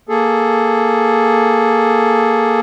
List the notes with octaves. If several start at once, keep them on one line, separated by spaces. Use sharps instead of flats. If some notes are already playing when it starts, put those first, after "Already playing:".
A#3 G#4 A4